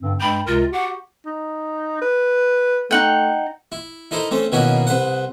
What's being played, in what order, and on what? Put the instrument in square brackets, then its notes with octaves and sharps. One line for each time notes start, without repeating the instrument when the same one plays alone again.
[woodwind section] G2 D3 C4
[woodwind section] G2 G#3 G5 [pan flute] B5
[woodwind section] C#2 C3 A#4 [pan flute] F4
[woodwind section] F#4 G4 [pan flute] F#5
[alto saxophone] D#4
B4
[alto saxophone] A3 [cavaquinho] D#4 F#5 G5
[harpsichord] E4
D#4 E4 A4 A#4 C5
A3 C4 C#4
B2 D#3 A#3 C#4 E4 F#4
C2 B4 C5 F#5